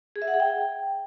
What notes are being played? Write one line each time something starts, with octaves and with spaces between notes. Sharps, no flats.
G#4
E5
F#5
G#4
G5